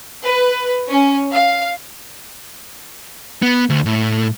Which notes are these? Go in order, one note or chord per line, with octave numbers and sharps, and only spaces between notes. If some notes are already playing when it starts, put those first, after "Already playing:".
B4
C#4
F5
B3
D2
A2